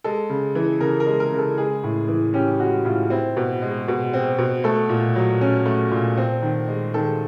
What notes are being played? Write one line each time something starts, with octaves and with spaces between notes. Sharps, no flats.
G#3 A4
C#3
E3
C#3 A#4
A#4
G#3
A#4
C#3
A4
G#3 G#4
A2
E3
C#4 G4
G#3 F#4
A2 F4
C4 E4
B2
G#3
B2
C4
B2
A3 A4
A#2
F#3
C#4
A3
A#2
C4
D#3
G#3
D#3 A4